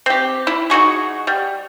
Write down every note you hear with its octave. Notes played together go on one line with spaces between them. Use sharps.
C4 G4
E4
F#3 D#4 F#4 G#4
G3